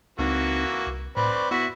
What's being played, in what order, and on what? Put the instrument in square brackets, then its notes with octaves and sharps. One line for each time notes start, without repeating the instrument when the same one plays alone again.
[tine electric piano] C#2 C4 D#4 [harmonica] E3 A#3 F#4
[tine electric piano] C2
[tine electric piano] A2 [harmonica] C4 B4 D5
[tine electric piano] C6 C#6
[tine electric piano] B3 E5 B6 [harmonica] E4 F#4